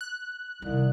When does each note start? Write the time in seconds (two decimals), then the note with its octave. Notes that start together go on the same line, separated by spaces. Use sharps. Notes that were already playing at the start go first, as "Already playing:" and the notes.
0.01 F#6
0.62 C2 C3 D#3